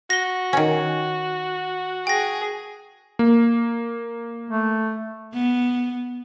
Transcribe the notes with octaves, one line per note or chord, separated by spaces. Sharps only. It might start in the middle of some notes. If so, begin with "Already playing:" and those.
F#4 A#6 G7
D#3 C#4
G#4 G5 A#6
A#3
A3
B3